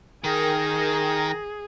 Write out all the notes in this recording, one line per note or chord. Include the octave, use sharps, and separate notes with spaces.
D#3 G#4 A#4 G5 A#6